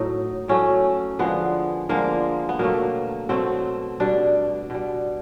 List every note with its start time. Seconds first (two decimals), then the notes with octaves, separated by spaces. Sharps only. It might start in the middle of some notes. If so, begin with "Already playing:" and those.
Already playing: A2 F#3 A3 D#4
0.48 A2 F#3 A3 C#4
1.19 D3 F3 G#3 B3
1.89 D3 F3 G#3 A#3
2.49 B3
2.59 B2 F#3 A3 A#3
3.29 B2 F#3 A3 C4
4.00 B2 G3 D4
4.70 B2 G3